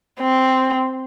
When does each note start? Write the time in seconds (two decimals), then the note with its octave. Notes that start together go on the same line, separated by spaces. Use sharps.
0.20 C4